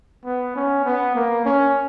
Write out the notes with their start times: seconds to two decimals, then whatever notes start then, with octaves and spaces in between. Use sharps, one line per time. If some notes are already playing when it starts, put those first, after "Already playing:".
0.25 B3
0.56 C#4
0.85 B3
1.15 A#3
1.45 C#4